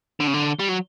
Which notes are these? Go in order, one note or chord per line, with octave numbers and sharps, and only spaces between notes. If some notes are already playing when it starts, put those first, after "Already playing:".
D3
C#3
D3
G3
F#3